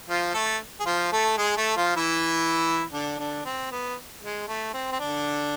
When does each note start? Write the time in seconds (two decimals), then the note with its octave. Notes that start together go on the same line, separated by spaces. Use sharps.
0.09 F3 F4
0.34 A3 A4
0.80 G#4
0.86 F3 F4
1.13 A3 A4
1.37 G#3 G#4
1.57 A3 A4
1.77 F3 F4
1.96 E3 E4
2.93 D3 D4
3.19 D3 D4
3.45 C4
3.71 B3
4.22 G#3
4.48 A3
4.74 C4
4.92 C4
5.00 D3 D4